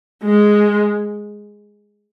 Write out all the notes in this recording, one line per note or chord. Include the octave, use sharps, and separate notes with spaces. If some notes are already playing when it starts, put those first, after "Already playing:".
G#3